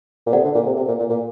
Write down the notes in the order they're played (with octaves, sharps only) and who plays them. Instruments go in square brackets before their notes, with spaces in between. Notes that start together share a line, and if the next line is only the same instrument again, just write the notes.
[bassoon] A#2
[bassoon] C3 [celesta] A4 D5 F#5
[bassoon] D3
A#2
C3
C3
A#2
A#2
A#2